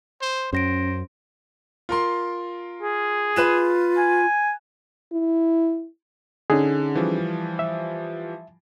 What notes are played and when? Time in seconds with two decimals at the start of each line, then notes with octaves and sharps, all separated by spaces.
0.22 C5
0.53 F#2 C#4 C5 A#6 D7
1.89 F4 A#4 C6
2.82 G#4
3.36 F4 B4 F#6 E7
3.97 G#5
5.12 E4
6.50 D3 C#4 D#4 G#4
6.95 E3 F3 G3
7.59 E5